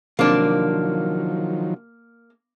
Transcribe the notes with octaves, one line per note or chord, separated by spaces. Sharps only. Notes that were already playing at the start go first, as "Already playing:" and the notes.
C3 D#3 F3 F#3 A#3 D4